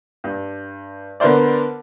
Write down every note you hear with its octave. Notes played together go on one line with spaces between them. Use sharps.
G2
D3 B3 A#4 C5 D5